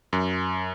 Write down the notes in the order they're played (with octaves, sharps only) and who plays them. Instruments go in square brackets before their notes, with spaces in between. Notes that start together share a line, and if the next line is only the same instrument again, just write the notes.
[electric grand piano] F#2